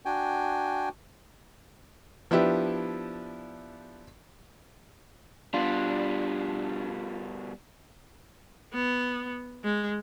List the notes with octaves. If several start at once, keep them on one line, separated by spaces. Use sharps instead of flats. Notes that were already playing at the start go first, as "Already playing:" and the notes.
D4 F#4 G5 G#5
F3 B3 D4 E4 G4
B2 G3 D4 F4
B3
G#3